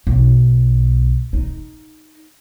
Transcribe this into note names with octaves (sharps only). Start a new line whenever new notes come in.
B1
D#4